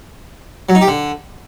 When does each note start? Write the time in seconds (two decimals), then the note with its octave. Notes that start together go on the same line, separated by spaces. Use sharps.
0.69 F#3
0.75 D#4
0.81 G4
0.88 D3